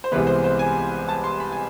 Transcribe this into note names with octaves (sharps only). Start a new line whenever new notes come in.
C5
C2 C3 E3 G#3 B3 B4
C5
C5
G#5
A5
C6
B5
G#5